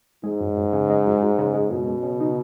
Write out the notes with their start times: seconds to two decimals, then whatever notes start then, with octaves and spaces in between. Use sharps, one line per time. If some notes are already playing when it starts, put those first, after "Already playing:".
0.24 G#2 G#3
0.40 F#2
0.57 F#2
0.73 C#3
0.90 G#3
1.06 F#2
1.22 F#2
1.39 C#3
1.54 G#3
1.70 F#2 B2
1.87 F#2
2.03 C#3
2.20 D#4